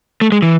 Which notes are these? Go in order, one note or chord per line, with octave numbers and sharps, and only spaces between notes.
A3
G#3
E3